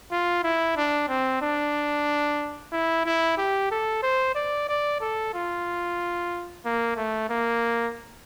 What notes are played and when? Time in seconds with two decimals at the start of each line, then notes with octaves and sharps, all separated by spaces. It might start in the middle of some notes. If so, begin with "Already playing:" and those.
0.12 F4
0.43 E4
0.77 D4
1.09 C4
1.42 D4
2.72 E4
3.06 E4
3.38 G4
3.71 A4
4.03 C5
4.35 D5
4.69 D5
5.01 A4
5.35 F4
6.65 A#3
6.97 A3
7.30 A#3